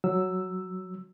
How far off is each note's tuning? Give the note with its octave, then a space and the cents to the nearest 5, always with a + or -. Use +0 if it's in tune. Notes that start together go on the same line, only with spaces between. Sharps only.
F#3 +0 E6 +0